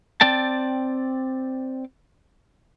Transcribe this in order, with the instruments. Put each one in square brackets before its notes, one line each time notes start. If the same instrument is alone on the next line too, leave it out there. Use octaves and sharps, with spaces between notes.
[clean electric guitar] C4 D5 G5 A5